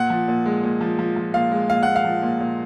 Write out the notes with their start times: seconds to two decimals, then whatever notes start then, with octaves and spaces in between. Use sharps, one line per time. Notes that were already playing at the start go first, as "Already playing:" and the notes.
Already playing: A#2 F#5
0.10 F3
0.28 A#2
0.46 G#3
0.64 A#2
0.81 F3
0.99 F3
1.16 F3
1.34 A#2 F5
1.51 G#3
1.69 A#2 F5
1.83 A#2 F#5
1.96 F5
2.05 F3
2.22 A#2
2.40 A#2